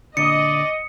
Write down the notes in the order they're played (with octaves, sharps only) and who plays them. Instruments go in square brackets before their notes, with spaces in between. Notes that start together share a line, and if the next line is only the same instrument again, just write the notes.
[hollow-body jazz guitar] A#2 D3 [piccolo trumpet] D5 [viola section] D#5 [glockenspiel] C#7